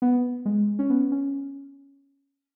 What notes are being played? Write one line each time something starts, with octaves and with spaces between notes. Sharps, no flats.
B3
G#3
C#4
B3
C#4